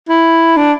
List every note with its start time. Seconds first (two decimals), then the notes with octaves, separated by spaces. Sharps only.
0.09 E4
0.56 D4